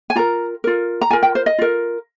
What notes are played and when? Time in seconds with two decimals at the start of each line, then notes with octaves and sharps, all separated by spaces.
0.10 G#5
0.16 F4 A#4 A#5
0.64 F4 A#4
1.01 A#5
1.11 F4 A#4 G#5
1.23 G5
1.35 C5
1.46 D#5
1.58 F4 A#4